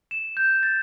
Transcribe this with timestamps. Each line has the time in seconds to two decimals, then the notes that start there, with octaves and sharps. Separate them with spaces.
0.11 E7
0.37 G6
0.63 A6